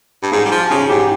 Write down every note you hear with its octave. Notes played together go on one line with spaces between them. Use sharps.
G2
G#2 G#4
G3
F3
C#3 G#4
G#2 G4